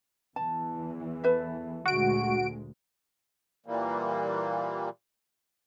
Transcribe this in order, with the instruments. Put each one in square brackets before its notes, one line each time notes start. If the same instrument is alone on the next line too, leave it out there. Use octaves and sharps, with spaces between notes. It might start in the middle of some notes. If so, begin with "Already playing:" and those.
[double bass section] E2 E3 [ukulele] A5
[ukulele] A4 B4 E5
[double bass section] D2 A#2 G#3 [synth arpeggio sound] F#4 D7
[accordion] A#2 E3 G3 A#3